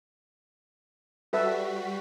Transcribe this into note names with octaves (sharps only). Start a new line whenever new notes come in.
G3 F#4 A4 B4 E5 B6